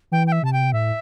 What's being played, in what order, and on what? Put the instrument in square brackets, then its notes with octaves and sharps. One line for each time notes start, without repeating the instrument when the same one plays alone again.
[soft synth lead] E3 [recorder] G5
[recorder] G5
E5
[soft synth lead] C3 [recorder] A5
[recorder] G5
[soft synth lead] A2 [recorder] E5